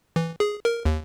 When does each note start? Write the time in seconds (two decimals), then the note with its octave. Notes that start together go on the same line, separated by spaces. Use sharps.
0.16 E3
0.40 G#4
0.65 A#4
0.85 D#2